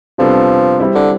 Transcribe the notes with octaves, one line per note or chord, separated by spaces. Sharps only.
C3 F3 G3 B3 D4 A4
G3 C4 E4
D3